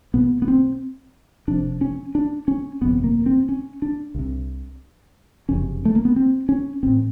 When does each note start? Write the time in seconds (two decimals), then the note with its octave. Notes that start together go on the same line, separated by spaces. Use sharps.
0.14 B1 B2 B3
0.42 B3
0.48 C4
1.48 F1 F2 C3 D4
1.81 C#4
2.15 D4
2.48 C#4
2.81 G1 F2 C3 B3
3.04 A#3
3.26 C4
3.49 C#4
3.82 D4
4.15 C2 C3
5.49 F#1 F2 C3 C#4
5.85 A3
5.95 A#3
6.05 B3
6.16 C4
6.49 C#4
6.83 A1 A2 C4